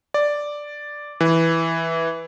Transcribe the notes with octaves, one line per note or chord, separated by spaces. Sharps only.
D5
E3